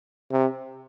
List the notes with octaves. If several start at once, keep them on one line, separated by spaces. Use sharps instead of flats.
C3